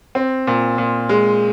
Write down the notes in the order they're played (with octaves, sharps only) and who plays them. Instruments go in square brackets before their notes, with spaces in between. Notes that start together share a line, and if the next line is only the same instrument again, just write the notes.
[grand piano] C4
A#2
A#2
G#3